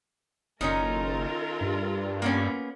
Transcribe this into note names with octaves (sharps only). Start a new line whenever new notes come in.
F#1 D#3 C#4 D#4 F4 A4 A#4
G2
A#3 B3 C#4